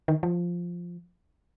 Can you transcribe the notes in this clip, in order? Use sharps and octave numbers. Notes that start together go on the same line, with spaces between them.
D#3
F3